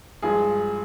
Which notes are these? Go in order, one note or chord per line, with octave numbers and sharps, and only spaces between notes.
G2 F3 G#3 G#4